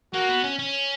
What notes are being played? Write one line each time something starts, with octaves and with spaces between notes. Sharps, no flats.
A#3 F#4
B3
C#4
C#4